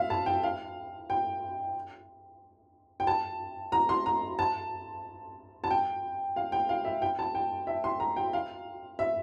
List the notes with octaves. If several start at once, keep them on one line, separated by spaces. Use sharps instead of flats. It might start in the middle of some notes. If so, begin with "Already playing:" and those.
Already playing: E5 F5
A5
G5
F5
G5
G5
A5
A#5
C6
A#5
A5
A5
G5
F5
G5
F5
E5
G5
A5
G5
E5
C6
A#5
G5
F5
E5